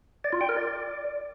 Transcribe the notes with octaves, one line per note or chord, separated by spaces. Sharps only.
D5
F4
G5
A#4
D5